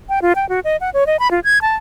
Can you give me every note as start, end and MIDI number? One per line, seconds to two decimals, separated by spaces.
0.09 0.19 79
0.22 0.33 65
0.36 0.48 79
0.49 0.60 66
0.64 0.77 75
0.81 0.90 78
0.94 1.06 73
1.07 1.17 75
1.19 1.30 83
1.31 1.40 65
1.44 1.59 92
1.62 1.76 81